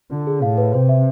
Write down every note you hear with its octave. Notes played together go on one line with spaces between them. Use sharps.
D3 F4
G#4
A2 F5
B4
C3 C5
E5